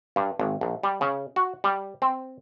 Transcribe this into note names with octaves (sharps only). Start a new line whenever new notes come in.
G2
G#1
A#1
G3
C#3
F#4
G3
C4